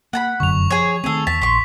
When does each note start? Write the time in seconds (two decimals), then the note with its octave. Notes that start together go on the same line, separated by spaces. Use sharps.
0.13 A#3 F#5 A5 B5
0.40 F1 F#2 D3 C#6 F7
0.70 F3 G#4 C#5
1.04 D#3 A3 C4 G#4 A4
1.27 E2 A5 B6
1.42 A#1 C6 C#6 B6